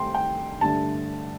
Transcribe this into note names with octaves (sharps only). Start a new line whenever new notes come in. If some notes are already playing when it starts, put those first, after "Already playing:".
Already playing: C2 C3 A3 C4 G5 C6
G5
G2 D3 A3 A5